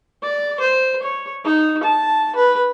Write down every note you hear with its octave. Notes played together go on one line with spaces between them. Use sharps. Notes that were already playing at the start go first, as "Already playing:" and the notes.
D5
C5
C#5
D#4
A5
B4